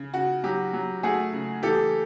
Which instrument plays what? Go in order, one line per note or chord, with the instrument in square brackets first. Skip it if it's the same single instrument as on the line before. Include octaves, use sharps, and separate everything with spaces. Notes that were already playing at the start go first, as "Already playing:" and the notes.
Already playing: [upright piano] C#3
C#3 F#4
F#3 G4
F#3
A3 F#4 G#4
C#3
E3 G4 A4